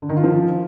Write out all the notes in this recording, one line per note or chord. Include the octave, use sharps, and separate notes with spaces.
D3
D#3
F4
F3